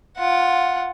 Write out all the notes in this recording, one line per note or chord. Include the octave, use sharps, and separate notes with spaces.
F4 F#5